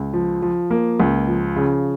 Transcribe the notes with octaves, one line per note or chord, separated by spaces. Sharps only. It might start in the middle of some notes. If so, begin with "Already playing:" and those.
Already playing: C#2
F3
F3
A#3
C#2
F3
C#3